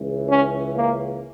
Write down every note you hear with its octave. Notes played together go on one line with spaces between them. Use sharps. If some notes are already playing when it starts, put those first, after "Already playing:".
Already playing: C#2 C#3 E3
C#4
A#3